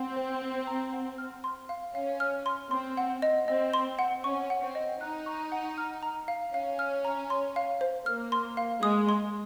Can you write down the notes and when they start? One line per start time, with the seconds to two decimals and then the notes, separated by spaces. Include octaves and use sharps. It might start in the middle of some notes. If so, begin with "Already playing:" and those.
Already playing: C4 F#5
0.16 C5
0.42 C5
0.67 A#5
0.93 F#5
1.18 F6
1.44 C6
1.69 F5
1.95 C#4 F5
2.20 F6
2.46 C6
2.71 C4 C6
2.97 F#5
3.22 D#5
3.48 C4 D#5
3.74 C6
3.99 F#5
4.24 C#4 C#6
4.50 F#5
4.63 C4
4.75 D#5
5.01 D#4 F#6
5.26 C#6
5.52 F#5
5.78 F6
6.03 A#5
6.28 F5
6.54 C#4 F5
6.79 F6
7.05 A#5
7.30 C6
7.56 F5
7.81 C5
8.06 A#3 F6
8.32 C6
8.57 F5
8.83 G#3 D#6
9.09 C6